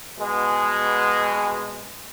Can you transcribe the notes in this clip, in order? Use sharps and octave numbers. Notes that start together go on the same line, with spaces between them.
B2 G#3